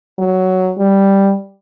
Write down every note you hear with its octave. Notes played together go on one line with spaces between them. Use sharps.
F#3
G3